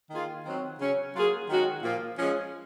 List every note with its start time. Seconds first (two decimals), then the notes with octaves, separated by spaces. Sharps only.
0.10 D#3 A#3 F4 G#4
0.45 D#3 F#3 C4
0.80 C#3 F#3 C#4
1.14 F#3 A#3 F4 G#4
1.49 D#3 G#3 C#4 F#4
1.83 A#2 F3 A#3 F4
2.18 F3 G#3 C#4